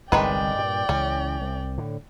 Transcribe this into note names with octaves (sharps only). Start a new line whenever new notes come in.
G1 C2 G2 D#3 G#3 B4 D5 G5
G2 A#2
C#2 C#3 E3 C#4
C2
A2 D3